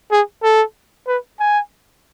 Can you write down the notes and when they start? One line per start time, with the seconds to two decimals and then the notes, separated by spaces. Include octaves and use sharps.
0.12 G#4
0.43 A4
1.07 B4
1.40 G#5